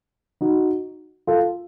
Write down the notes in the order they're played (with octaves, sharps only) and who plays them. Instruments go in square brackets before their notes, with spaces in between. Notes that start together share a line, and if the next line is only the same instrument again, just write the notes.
[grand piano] D#4 F#4
F4 A4